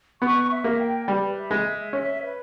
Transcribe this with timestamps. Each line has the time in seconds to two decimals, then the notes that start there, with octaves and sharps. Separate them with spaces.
0.21 B3 C#6
0.50 E5
0.64 A#3
0.79 G5
1.07 G3 B4
1.36 E5
1.51 G#3
1.65 E5
1.93 C#4 E5
2.22 B4